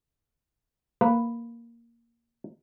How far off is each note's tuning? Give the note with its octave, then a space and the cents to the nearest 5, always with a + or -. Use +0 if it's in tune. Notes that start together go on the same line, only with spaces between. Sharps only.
A#3 +0 B4 +0